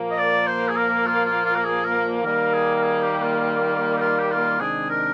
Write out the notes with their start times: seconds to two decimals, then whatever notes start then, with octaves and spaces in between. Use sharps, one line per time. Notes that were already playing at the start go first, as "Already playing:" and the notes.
Already playing: A#2 F3 A#3
0.11 D#5
0.18 D5
0.47 C5
0.68 G#4
0.76 A#4
1.07 F4
1.25 F4
1.45 F4
1.56 A#4
1.65 G#4
1.85 A#4
2.23 D#3 G3 A#3 A#4
2.54 G#4
2.75 A#4
2.83 G#4
3.03 G4
3.22 F4
3.97 D#4
4.01 F4
4.19 G4
4.31 F4
4.60 C3 D#3 G#3 D4 G#4
4.90 A#4